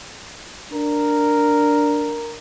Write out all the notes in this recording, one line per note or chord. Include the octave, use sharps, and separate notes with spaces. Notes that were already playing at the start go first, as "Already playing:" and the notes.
D4 A#4